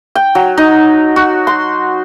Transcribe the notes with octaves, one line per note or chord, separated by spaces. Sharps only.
G5
F#3
D#4
F#4
C6